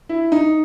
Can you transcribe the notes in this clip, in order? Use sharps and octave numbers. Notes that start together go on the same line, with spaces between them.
E4
D#4